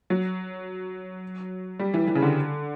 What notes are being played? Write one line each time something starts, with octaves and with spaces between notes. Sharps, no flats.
F#3
G3
E3
E3
C#3
D3